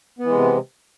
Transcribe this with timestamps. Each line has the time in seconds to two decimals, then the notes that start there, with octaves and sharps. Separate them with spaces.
0.19 B3
0.24 E3
0.29 G#3
0.34 C3